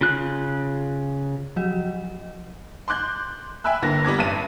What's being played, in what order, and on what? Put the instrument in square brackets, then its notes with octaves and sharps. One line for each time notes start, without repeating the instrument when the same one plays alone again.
[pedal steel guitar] C#3 F4 F#6
[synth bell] F3 F#3 F#4 D#5
[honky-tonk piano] C6 D6 F#6 G6
E5 G5 G#5 B5 E6 F#6
G1 D3 A#3 A#6
G3 B3 D6 G#6
A1 G2 D#7